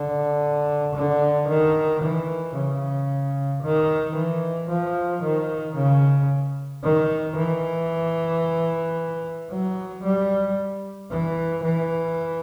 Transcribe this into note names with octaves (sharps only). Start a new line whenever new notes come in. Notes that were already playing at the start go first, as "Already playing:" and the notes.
Already playing: D3
D3
D#3
E3
C#3
D#3
E3
F3
D#3
C#3
D#3
E3
F#3
G3
E3
E3